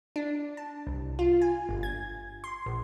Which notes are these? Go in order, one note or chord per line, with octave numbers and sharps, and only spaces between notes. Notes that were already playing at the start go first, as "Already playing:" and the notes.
D4
A5
C2
F4
G#5
G1
G#6
C6
A#1